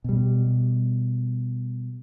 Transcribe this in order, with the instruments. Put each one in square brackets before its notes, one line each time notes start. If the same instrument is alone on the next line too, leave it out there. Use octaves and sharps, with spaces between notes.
[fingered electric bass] B2 G3